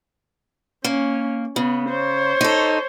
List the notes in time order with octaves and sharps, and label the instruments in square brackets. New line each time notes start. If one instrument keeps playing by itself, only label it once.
[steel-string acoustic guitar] A#3 [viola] C#4
[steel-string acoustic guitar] C#3 [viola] B3
[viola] C5 C#5
[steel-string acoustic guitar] D#4 A4